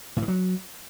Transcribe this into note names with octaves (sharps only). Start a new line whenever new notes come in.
A2
D#3
F#3